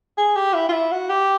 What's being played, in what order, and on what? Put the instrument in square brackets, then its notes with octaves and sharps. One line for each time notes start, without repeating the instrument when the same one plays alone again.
[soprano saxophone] G#4
G4
E4
F4
E4
F#4
G4